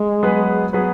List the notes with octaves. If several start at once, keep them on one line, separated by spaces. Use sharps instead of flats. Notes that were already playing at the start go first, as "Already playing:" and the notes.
Already playing: G#3
F#3 B3 G#4 B4
F#3 B3 G#4 B4